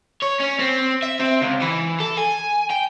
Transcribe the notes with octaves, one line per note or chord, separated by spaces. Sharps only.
C#5
C#4
C4
E5
C4
C#2
E3
A4
G#5
G5